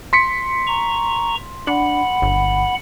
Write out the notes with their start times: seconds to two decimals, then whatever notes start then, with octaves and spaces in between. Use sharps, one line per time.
0.13 C6 B6 C#7
0.67 A#5 C#6
1.67 D4 F#5 B5
2.22 G1